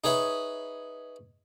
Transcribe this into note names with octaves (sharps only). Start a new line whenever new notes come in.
D#4 G#4 B4 C#5 E5